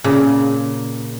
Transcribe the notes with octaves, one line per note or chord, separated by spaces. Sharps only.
A#2 C#3